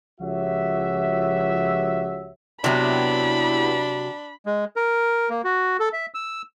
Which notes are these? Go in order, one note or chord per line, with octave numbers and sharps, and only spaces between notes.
C#2 F3 F#4 G4 C#5 E5
C3 F#3 B3 D4 E4 G4 B5
G#3
A#4
A#3
F#4
A4
E5
E6